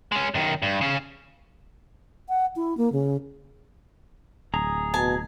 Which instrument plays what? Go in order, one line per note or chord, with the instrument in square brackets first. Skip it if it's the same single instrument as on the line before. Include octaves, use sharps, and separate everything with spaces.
[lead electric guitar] G#3 C#4
F#2 D#3
G2
C#3 C#4
[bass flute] F#5
E4
A#3
C#3
[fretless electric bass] D1 [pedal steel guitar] G#4 A#5
[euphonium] B2 [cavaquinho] G#5 A5